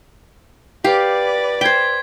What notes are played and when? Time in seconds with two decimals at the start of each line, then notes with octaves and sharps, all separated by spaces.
0.84 G4 B4 D5 F5
1.61 C5 G5 G#6 B6